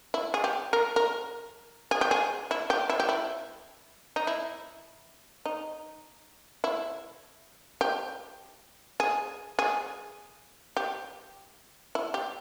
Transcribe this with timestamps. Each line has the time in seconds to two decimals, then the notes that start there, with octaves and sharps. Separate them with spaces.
0.14 E4
0.34 G#4
0.44 G4
0.73 A#4
0.96 A#4
1.91 G#4
2.01 G4
2.11 G#4
2.51 E4
2.70 G4
2.90 E4
3.00 G4
3.09 E4
4.16 D#4
4.27 E4
5.46 D#4
6.64 E4
7.81 G4
9.00 G#4
9.59 G#4
10.77 G4
11.95 E4
12.14 G4